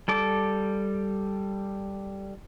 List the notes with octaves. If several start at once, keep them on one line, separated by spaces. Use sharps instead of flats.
G3 A4 D6